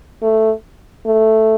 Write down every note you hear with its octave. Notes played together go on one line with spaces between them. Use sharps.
A3
A3